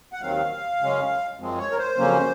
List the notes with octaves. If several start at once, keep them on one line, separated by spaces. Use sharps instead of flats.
F#5
D#2 D#3 F#3 C4 F5
F#2 C#3 G#3 C#4
F#2 F3 G#3 C4
C#5
A#4
C5
F2 C#3 F#3 A#3 C#4